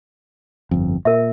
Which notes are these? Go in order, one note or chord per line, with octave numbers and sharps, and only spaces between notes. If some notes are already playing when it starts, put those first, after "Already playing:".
G1 F2
A#2 A#4 E5